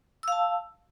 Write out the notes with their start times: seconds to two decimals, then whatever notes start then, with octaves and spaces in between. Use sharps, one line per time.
0.23 E6
0.28 F5
0.32 A5